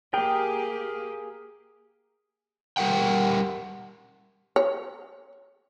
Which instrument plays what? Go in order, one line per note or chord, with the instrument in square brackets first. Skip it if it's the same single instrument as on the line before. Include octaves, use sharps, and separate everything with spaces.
[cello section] A#3 G4 [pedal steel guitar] G#4 A#4 [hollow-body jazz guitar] G5
[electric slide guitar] G3 G4 A#4 F#5 G5
[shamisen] C#5